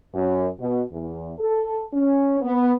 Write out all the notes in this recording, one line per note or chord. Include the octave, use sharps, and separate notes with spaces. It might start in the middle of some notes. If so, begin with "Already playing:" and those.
F#2
B2
E2
A4
C#4
B3